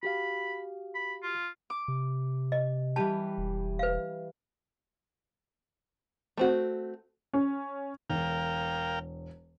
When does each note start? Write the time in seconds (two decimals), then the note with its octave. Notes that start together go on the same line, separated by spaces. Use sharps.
0.03 F#4 G4 F5 B5
0.95 B5
1.23 F4
1.70 D6
1.88 C3
2.52 D#5
2.96 E3 G3 G4 A5
3.38 E1
3.79 B4 F5
6.37 A3 C4 F#4
7.34 C#4
8.10 E1 A#4 F5 G5